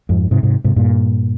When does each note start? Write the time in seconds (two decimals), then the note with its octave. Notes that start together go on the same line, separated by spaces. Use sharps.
0.09 F2 G#2
0.31 G#2 C3
0.43 G#2 C3
0.64 G#2 C3
0.76 G2 A#2